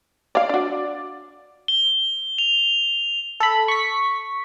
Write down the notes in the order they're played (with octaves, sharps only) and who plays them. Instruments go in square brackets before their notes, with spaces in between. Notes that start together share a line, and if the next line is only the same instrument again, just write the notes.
[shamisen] C#5 F5 [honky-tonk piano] D5
[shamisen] D4 F#4
[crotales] G7
F7
[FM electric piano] A4 B5
C#6 B6